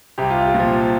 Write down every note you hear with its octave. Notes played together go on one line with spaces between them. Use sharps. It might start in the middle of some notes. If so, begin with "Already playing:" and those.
C2 G4
F4
G4
A#2 F3